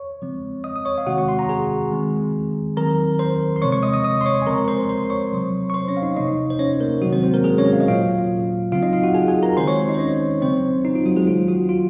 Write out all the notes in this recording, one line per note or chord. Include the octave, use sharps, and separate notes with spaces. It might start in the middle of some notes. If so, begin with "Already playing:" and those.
Already playing: C#5 C#6
C#3 F3 G#3 C4
D#5 D#6
D#6
C#5 C#6
F5
C3 D#3 G#3 C4 F#4 F#5
C#6
C6
A#5
G#4 G#5
D#3 G#3 C4
D#3 F#3 C4 A#4 A#5
C5 C6
C6
C3 F3 G#3 C4 C#5 C#6
C#5 C#6
D#5 D#6
D#5 D#6
D#5 D#6
C6
C#5 C#6
G#5
C#3 F3 G#3 C4 A#4 A#5
C5 C6
C5 C6
C6
C#5 C#6
C3 F#3 C4
C#6
C5 C6
C#4 C#5
F5
D#4 D#5
C3 F3 A#3 D#4 D#5
C5
C#4 C#5
A#3 A#4
C3 D#3 F#3 G#3 C4 F#4
C4 C5
C4 C5
A#3 A#4
G#3 G#4
C#4 C#5
F5
D#5
A#2 F#3 A#3 F4 F5
C#3 F#3 C4 F4 F5
D#4 D#5
F4 F5
F#4 F#5
G#4 G#5
G#4 G#5
A#4 A#5
D#3 G#3 C4 C5 C6
C#5 C#6
D#4 D#5
C5
C#4 C#5
C#3 F#3 A#3 C4 C5
D#4
F4
F#3 F#4
G#3 G#4
D#3 F#3 A#3 F4
F#3 F#4
F4